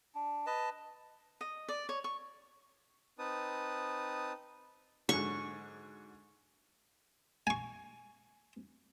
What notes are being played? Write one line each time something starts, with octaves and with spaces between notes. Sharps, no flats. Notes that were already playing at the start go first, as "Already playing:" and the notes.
D4
B4 D#5 A5
D#5
D5
C#5
C#6
C4 D#4 B4 A5 D#6
G#2 D3 F#3 C#6
G#5 C#6